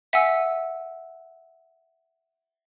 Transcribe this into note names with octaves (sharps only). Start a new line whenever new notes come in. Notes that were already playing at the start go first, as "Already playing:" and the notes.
E5 F#5 G#5 E6